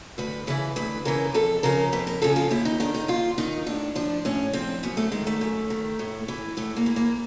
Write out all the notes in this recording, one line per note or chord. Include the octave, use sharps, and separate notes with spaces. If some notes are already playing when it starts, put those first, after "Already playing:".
D2 B4
C#3 E3 B4
D2 B4
C#3 E3 A#4
F2 A4
C#3 F3 A#4
F2 B4
A#4
C#3 F3 A4
F4
D#2 E4
D#4
D#3 D4
D#4
D#2 F4
D#3 D#4
A2 D4
F3 D4
A2 C#4
F3 C4
F#2 B3
A3
D#3 G#3
A3
F#2
D#3
A2
E3
A2 A3
A#3
E3
A#3